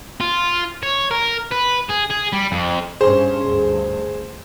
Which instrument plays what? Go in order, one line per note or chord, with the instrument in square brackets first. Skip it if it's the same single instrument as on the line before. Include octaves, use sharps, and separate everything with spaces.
[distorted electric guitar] F4
C#5
A#4
B4
G#4
G#4
G3
F2
[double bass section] G2 C#4 [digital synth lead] G#4 [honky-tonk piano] C5 C6
[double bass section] D2 G2